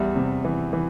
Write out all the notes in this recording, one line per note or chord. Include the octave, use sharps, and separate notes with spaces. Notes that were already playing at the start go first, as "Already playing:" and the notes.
Already playing: E2 G3 E5
C3
E3
E3